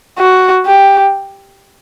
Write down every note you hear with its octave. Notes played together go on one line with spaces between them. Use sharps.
F#4
G4